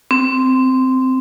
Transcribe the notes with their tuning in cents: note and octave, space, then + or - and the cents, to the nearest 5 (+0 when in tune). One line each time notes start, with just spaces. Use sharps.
C4 -10